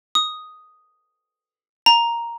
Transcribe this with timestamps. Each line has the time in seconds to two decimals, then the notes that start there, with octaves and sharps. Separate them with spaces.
0.15 D#6
1.86 A#5